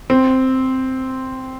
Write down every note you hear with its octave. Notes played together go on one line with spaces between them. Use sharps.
C4